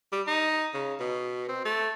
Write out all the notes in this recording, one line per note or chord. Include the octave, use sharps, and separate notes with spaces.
G3
D#4
C#3
B2
C4
A3